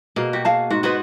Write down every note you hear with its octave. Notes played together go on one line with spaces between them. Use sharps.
B2 A#3 G#4
F#4 G4
G#4 F5 A5
G#2 F#4
B3 F#4 B4 C5 D#5